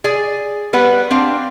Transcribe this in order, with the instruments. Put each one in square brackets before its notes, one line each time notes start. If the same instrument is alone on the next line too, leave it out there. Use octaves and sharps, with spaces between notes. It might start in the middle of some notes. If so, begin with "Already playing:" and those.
[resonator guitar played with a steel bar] G#4 D5 G#5
G3 B3 B4 F#5
C4 D4 F5